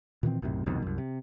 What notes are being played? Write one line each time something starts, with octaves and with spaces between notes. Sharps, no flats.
A#2 D#3 E3 C4
B1 F#2 A2 C3
C2 F2 B2 D#3
C2 F#2
C3